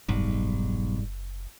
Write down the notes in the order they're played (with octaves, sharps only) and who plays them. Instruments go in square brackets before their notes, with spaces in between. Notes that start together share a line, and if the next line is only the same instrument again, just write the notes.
[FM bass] F#1 [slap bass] B1 [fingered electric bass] G#2 G3